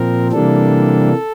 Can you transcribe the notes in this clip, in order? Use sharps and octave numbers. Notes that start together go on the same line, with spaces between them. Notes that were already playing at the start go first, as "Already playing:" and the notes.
Already playing: A#2 F3 C4 A#4
C3 E3 G3 A#3 D4 A4